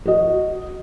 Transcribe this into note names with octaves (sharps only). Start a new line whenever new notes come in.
F#4 D#5